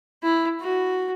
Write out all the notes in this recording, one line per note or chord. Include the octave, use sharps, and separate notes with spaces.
E4
F#4